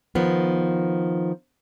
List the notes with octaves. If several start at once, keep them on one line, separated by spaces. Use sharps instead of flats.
D#3 F3 B3